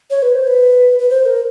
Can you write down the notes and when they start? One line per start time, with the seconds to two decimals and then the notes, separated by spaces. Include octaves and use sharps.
0.10 C#5
0.23 B4
0.35 C5
0.47 B4
0.99 B4
1.10 C5
1.26 A#4